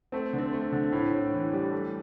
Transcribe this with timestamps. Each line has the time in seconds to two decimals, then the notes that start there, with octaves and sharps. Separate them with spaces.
0.12 A3 C4
0.33 D3
0.38 C4
0.53 A3
0.72 D3
0.92 A2
1.13 A2
1.32 E3
1.53 G3
1.72 A3